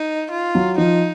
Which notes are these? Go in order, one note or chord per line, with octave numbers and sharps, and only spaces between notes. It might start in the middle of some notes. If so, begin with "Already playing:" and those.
Already playing: D#4
F4
F#3
F3 D#4